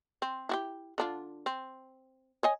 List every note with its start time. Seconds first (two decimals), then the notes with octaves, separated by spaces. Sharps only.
0.22 C4
0.49 E4 F#4 G4
0.98 D3 D4 F4
1.46 C4
2.43 C#5 D#5 G#5